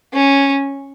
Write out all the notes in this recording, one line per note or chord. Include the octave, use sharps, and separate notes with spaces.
C#4